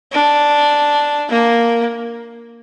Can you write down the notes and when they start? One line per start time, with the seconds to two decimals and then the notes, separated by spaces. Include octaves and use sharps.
0.12 D4
1.30 A#3